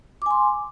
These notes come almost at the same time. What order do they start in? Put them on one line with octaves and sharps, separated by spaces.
D6 G#5 C6